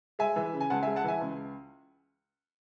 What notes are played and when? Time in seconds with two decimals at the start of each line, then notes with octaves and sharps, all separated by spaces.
0.19 G#3 E5 G#5
0.36 E3
0.53 C#3
0.61 G#5
0.70 C#2 F#5 A5
0.83 E5 G#5
0.87 G#3
0.96 F#5 A5
1.04 E3 E5 G#5
1.21 C#2